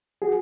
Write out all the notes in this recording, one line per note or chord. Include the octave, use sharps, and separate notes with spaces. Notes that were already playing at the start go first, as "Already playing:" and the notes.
F#4 G#4